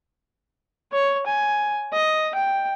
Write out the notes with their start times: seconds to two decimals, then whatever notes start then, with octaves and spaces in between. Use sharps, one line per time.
0.92 C#5
1.26 G#5
1.92 D#5
2.35 G5